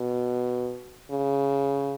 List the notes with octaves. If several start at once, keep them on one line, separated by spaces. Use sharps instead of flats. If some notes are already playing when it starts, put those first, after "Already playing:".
Already playing: B2
C#3